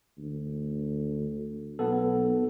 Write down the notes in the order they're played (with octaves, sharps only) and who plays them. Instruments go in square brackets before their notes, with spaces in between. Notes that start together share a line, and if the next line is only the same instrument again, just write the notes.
[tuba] D2
[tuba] B1 [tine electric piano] B3 A4